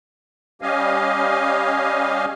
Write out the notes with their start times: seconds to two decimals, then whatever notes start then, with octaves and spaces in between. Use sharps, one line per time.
0.62 G3 C#4 G4 D#5 F5 G#5